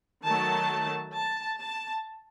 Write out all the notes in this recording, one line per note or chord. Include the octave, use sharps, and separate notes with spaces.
D#3 F#3 A3 A5
A5
A5